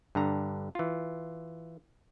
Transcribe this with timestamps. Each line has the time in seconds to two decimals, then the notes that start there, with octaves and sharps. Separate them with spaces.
0.15 G2 D3 A#5
0.75 E3 F4